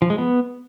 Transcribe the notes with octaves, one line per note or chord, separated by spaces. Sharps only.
F3
G#3
B3